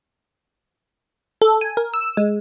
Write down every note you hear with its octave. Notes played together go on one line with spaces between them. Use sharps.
A4
G#5
A#4
E6
G#3